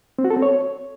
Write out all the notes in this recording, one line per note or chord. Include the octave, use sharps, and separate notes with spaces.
C4
F#4
A4
C4
C#5